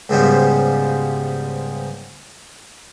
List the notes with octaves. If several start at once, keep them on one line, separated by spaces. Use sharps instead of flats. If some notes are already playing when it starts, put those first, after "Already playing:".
C#2 G#2 F3 G3 B3